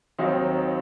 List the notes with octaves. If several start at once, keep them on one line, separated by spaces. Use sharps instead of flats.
D#2 D#3 F#3 C4 D#4